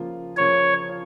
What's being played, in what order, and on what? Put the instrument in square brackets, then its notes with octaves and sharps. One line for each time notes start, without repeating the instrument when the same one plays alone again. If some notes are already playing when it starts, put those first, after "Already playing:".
Already playing: [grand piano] C#3 F3 A#3 F4
[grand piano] C#3 F3 A#3 F4 [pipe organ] C#5
[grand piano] F4